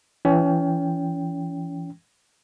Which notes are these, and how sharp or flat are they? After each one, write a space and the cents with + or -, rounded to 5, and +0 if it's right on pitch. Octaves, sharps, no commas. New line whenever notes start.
E3 +25 C#4 +30 G5 +0